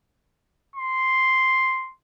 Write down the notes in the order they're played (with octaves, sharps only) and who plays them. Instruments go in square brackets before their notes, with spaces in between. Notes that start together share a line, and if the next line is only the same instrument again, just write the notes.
[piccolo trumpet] C6